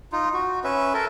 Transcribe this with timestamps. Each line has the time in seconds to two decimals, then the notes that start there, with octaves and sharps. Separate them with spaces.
0.12 D#4 F4
0.34 F#4
0.64 C#4 B4 E5
0.94 A4 A#4 E5